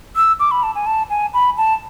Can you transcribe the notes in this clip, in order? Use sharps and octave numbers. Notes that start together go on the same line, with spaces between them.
E6
D6
B5
A5
G#5
A5
G#5
B5
A5